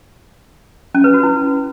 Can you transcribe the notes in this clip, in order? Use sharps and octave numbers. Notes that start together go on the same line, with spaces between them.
C#4
B4
F#4
E4